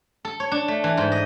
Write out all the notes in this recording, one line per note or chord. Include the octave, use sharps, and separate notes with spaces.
A4
C#5
D4
A3
E3
G#2
D#5